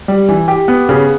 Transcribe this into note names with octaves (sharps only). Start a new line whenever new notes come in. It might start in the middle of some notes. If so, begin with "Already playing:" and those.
G3
E3
G4
B3
C#3